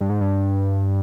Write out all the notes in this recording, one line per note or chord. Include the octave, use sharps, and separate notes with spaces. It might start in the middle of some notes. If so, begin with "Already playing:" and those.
G2
G#2
G2